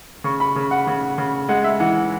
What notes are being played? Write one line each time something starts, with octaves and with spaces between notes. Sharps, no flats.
C#3 C#6
B5
C#3
F#5
C#3
C#3
G#3 F#5
E5
E3 F#5